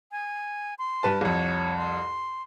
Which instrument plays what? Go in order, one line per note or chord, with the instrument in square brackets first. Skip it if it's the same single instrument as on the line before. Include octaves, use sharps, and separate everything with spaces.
[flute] G#5
C6
[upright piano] G2 B4 A5
[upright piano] C2 F2 [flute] C#5
[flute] C6